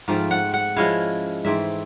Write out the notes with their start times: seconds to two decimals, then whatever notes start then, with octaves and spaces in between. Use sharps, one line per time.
0.08 G#2 F3 A3 C4 F5
0.31 F#5
0.54 F#5
0.76 F3 G#3 C#4 E4 F5
1.45 G#2 E3 A3 C4 E5